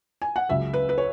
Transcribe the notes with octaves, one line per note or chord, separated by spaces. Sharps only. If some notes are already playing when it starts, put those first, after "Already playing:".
G#5
F#5
C#2 C#3 F#3 E5
B4
B4
C#5